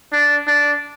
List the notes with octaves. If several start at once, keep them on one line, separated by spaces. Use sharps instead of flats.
D4
D4